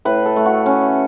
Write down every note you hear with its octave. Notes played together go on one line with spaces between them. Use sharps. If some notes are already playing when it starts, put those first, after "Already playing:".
A2 B4
A4
A3
F#4
C#4